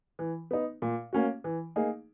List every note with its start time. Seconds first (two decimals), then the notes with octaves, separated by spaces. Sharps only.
0.19 E3
0.51 B3 D#4
0.82 A#2
1.13 A#3 C#4 F#4
1.44 E3
1.76 A#3 D#4 G#4